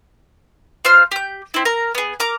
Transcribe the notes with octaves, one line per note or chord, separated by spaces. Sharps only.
F4 C5 F5 F6
G4 G6
C4 E4
A#4 A#5
B3 G#4
A#4 A#5 D6